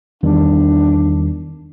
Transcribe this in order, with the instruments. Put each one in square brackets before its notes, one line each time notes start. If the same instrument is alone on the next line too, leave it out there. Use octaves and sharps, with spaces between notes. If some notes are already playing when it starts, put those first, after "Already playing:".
[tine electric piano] E2 D#3 G3 [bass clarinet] D4